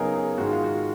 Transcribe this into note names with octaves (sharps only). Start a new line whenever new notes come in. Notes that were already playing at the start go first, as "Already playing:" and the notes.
Already playing: C#3 F#3 B3 D#4 G#4 A#4
G#4
G#2 D#3 G#3 F#4
F4
F#4